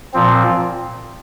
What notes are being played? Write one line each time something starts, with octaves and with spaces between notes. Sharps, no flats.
A#2 F3 C4